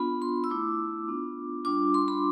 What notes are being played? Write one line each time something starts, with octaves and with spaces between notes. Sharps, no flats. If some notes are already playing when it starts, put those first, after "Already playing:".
Already playing: B3 D4 F4 B5
C6
E6
A3 E4 D6
B3 D4 F4
G3 D4 F4 D6
C6
B5